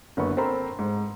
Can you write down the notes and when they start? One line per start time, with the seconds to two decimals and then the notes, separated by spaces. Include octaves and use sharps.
0.17 F#1 D3 B3 C#6
0.37 C4 A4 A#4 C5 A#5 B5
0.79 G#2